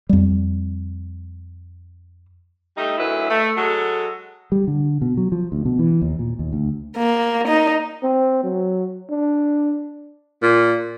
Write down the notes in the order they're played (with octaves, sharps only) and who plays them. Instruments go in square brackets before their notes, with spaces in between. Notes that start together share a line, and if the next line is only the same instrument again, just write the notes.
[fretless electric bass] F2 G3
[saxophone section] G3 A3 D#4
D2 D#3 F#3 E4 B4
A3
F#3 G#3 A4
[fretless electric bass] G3
D3
B2
F#3
F3
D2
B2
E3
D#2
A#2
D#2
D2
[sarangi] A#3
D#4
[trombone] C4
F#3
D4
[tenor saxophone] A#2